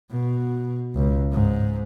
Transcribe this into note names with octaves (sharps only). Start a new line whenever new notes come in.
B2
C#2
G#2